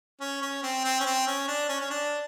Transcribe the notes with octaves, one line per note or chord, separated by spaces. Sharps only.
C#4
C#4
C4
C4
C#4
C4
C#4
D4
C#4
C#4
D4